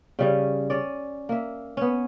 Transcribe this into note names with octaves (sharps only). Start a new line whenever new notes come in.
C#3 G3 C#4
C#4 D5
A#3 E5
B3 C#4